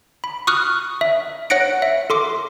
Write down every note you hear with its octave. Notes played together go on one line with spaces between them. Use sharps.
B5
C#6 D#6 F6 F#6
E5
C#5 F#5 F#6 A#6 C#7 D7
E5
A4 C6 D6